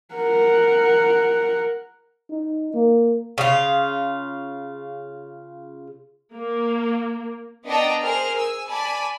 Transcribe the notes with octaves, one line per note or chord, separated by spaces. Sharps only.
A#4 F#5
D#4
A#3
C#3 F4
A#3
B3 D4 D#5 G5 A5 A#5
G#4 A#4 C5 F6
G#5 E6
D5 G#5 A5 B5